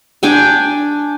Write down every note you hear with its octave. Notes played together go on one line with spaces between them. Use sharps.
D4 G5 G#5